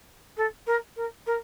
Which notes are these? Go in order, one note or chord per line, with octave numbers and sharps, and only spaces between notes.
A4
A#4
A#4
A#4